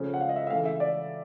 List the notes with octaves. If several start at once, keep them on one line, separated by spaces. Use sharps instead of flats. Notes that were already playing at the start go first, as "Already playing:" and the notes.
Already playing: C#3 F3 A3 C#4
F#5
F5
D#5
E5
E5
C#3 E3 A3 F5
E5
D5